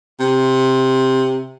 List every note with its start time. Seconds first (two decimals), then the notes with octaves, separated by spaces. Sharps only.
0.20 C3